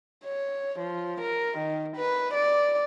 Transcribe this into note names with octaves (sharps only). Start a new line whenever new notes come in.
C#5
F3
A#4
D#3
B4
D5